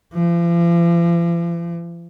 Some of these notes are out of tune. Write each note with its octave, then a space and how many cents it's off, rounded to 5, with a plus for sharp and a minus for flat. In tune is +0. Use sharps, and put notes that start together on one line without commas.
F3 -45